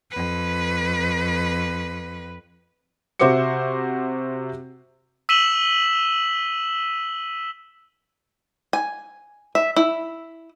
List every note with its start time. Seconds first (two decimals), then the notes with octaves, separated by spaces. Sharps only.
0.11 F2 B4
3.19 C3 F#4 C5 E5 D6 C#7
5.29 E6 B6 D#7 E7 F#7 G7
8.73 G#5
9.55 E5
9.76 E4